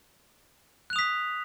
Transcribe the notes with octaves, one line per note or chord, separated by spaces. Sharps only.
D#6 F#6 B6 F7